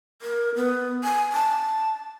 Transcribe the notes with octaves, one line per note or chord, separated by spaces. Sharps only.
A#4
B3
G#5
A5